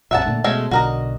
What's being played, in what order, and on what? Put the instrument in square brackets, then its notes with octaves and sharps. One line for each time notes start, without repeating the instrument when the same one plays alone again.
[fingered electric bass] A#1 F2 [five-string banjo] E5 F#5 A5
[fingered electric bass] A#2 D3 A3
[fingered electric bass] B2 [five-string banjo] G#3 A3 C#4
[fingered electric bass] B1 D3 [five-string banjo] F#4 A#4 D#5